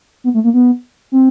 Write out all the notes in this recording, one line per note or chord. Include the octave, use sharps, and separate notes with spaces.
B3
A3
A#3
B3
C4